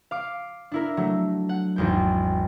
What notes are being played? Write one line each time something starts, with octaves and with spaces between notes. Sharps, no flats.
F5 D6
D4 E4 A#4
F#3 A3
F#5
G#1 E2 G5